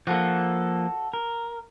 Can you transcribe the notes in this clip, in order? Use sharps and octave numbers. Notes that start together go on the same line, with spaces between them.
F3 A#3 F#4 A4 F#5
A#4